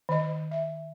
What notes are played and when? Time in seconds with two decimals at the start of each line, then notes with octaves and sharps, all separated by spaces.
0.09 D#3 D#5
0.51 E5